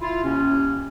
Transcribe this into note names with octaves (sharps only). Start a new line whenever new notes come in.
E4 F4
D#2 C3 C#4